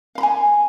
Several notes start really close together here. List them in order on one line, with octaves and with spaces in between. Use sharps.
F5 B5 A#5 G#5